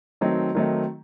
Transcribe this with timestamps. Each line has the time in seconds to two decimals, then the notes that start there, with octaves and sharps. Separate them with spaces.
0.21 D#3 F#3 A3 C4 D#4
0.55 D#3 F#3 A3 C4 D#4